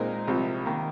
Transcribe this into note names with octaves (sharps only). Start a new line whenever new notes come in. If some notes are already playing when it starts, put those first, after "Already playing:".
Already playing: A#2 G#3 C4 D#4 A#4
C2 C3 F3
D#3 A#3